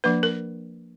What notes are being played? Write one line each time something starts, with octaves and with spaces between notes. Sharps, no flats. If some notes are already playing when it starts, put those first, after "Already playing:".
F3 A#3 D4 B4
A#4